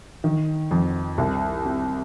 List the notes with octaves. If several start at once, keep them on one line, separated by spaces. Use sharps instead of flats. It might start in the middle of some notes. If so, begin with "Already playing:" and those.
D#3
F2
C2
C4